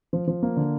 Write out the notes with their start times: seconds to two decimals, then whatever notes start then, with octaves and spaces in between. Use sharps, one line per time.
0.13 F3
0.27 F3
0.43 A#3
0.57 D3